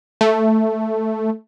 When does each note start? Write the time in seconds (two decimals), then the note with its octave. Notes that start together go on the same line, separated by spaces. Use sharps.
0.21 A3